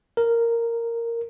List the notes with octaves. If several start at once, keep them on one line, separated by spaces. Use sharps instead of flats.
A#4